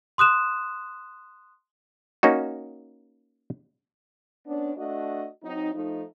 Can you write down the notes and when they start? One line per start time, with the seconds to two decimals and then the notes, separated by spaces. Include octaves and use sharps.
0.18 C6 D#6 F#6 E7
2.23 A#3 C#4 D#4 F#4
4.46 B3 C#4 D4
4.77 A3 D4 F#4 D#5
5.43 F#3 C4 D#4
5.74 F3 A3 D#4